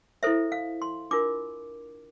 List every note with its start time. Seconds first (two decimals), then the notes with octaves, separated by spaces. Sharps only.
0.23 E4 A4 C5 E5
0.52 F5
0.82 C6
1.11 D4 F4 A#4 D6